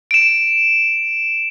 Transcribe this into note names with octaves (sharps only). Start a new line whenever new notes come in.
D7 E7